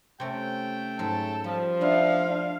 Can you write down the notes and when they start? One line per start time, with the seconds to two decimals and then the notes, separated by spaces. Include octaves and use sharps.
0.20 C3 A3 C#4 G5
0.99 G#2 F#3 A4
1.44 F3 G3
1.81 A3 D4 E4 F5
2.29 D4